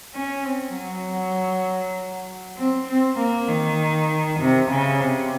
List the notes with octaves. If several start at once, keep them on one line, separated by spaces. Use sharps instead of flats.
C#4
C4
F#3
C4
C4
A#3
D#3
C3
C#3
C3